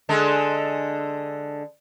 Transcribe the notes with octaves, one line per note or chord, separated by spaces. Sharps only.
D3 G#3 A4